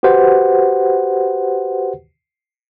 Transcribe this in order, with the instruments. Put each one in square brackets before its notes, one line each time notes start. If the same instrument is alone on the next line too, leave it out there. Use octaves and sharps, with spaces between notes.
[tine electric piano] F#4 G4 B4 C5 F#5